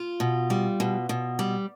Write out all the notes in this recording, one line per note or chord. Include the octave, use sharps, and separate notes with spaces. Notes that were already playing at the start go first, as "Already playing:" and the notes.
Already playing: F4
B2
G3
B2
B2
G3